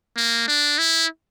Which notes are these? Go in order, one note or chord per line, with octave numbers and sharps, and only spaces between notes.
A#3
D4
E4